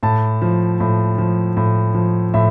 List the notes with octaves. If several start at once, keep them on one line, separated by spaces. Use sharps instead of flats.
A2 A5
F3
A2
F3
A2
F3
A2 E5